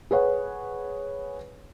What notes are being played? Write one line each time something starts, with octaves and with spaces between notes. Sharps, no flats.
G#4 B4 C#5 F#5